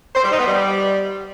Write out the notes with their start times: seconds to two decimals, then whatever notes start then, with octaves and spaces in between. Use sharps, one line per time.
0.15 C5
0.23 G3
0.31 D#4
0.39 B3
0.47 G3